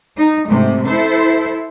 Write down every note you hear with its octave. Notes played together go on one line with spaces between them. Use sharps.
D#4
G#2 C3 A3
E4 A4 C5